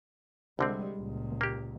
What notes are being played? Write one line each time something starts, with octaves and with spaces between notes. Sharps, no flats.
C2 D3 G3 G#3 C4
C#2 A#2
A#3 G4